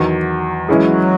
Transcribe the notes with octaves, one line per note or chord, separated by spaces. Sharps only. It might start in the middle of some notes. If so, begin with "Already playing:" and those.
Already playing: E2 D#3 F#3
E3 F#3 G#3 C#4 E4 G#4